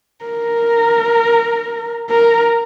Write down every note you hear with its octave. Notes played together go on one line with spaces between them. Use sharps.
A#4
A#4